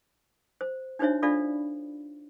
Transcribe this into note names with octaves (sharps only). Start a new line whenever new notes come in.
C5
D4 D#4 F#4 C5 C#5 E5
D4 F4 A4 D5 F5 B5